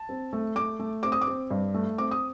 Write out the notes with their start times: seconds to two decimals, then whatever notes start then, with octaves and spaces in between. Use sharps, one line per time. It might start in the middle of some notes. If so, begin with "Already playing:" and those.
Already playing: A5
0.09 C4
0.33 A3
0.56 A3 D6
0.79 A3
1.03 C4 D6
1.12 D#6
1.21 D6
1.27 C4
1.51 G2
1.74 A3
1.98 C4 D6
2.11 D#6